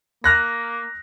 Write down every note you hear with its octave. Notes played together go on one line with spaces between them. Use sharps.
A#3 F6 F#6 A#6